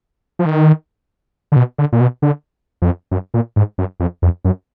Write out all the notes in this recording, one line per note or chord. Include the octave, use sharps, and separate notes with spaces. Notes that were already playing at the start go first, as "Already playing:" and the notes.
F3
D#3
D3
B2
D3
A#2
B2
D3
F2
F#2
A#2
G#2
F#2
F2
F2
F#2